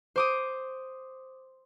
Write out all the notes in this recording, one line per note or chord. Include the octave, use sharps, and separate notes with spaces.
C5 D6 D#6